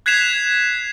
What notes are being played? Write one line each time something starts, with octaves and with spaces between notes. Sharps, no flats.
F#6 G#6 B6 C7 E7 F7